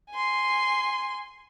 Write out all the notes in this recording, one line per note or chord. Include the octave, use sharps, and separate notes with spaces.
G#5 C6